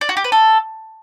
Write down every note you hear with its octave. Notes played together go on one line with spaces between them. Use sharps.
D5
F#4
G4
B4
A4